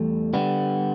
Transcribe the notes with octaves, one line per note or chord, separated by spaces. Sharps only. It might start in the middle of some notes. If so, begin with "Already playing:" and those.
Already playing: E2 E3 G3 A3
D3 G3 B3